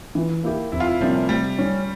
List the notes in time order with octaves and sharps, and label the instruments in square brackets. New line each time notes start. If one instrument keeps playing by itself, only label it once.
[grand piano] E3
A#3 E4 G4
[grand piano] F2 [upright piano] E4
[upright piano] F4
E4
[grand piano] C3 G3 A#3 C#4 [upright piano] F3
[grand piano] C3 [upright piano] G3
[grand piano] G3 C#4